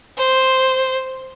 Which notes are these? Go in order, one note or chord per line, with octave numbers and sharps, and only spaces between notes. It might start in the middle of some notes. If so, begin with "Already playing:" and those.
C5